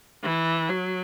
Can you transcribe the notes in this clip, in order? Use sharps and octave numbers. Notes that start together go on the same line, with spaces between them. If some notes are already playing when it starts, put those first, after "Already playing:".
E3
F#3